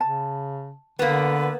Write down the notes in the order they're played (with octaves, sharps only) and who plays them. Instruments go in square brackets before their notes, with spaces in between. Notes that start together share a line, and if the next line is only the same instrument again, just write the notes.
[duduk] C#3 [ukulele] A5
[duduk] D3 [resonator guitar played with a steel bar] A#3 B3 [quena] B4